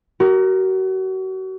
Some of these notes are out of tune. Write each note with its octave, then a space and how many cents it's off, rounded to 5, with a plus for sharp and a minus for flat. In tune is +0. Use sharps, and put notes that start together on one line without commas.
F#4 +35 A#4 +0